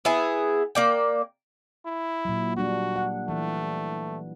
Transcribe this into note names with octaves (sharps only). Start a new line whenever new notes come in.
B3 E4 G#4
A#3 D5 G5
E4
A#2 F#3
G3 D4 F#4
F#5
E3 A3